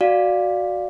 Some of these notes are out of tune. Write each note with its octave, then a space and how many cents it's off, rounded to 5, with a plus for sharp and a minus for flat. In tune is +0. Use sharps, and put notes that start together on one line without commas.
F#4 +0 D5 +0 F5 +0